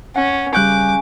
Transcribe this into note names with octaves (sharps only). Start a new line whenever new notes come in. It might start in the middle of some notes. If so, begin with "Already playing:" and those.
C#4 F#5
C#3 G3 D6 F#6 G6